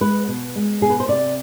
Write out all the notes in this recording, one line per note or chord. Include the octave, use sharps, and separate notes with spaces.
G#3 B4
B2
G#3
B2 G#4
B4
C5
C3 D5